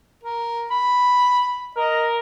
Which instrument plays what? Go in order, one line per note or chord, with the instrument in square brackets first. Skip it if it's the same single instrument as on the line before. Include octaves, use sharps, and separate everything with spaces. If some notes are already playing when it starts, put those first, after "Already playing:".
[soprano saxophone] A#4
B5
[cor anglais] A#4 [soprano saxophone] D#5